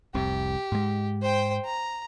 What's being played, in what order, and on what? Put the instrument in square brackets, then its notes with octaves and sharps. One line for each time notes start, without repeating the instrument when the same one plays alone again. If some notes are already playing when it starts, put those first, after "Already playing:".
[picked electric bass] F1 C2 C3 [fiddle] G4
[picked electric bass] G#2 G#3
[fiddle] C5 G5
A#5